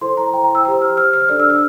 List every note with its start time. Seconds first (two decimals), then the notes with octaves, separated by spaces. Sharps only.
0.01 E4 A4 C5 C6
0.17 A#5
0.33 G5
0.44 A#5
0.55 E6
0.65 G4 C5 E6
0.82 F6
0.97 F6
1.13 F6
1.29 D4 A4 D5 F6
1.40 E6
1.50 F6